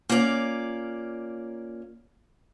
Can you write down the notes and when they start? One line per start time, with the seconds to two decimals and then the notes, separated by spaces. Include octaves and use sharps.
0.09 A#3 C#4 F4 D5